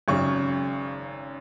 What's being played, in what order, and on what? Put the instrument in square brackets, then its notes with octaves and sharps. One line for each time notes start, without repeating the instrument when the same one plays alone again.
[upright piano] G#1 F#2 C#3 C#6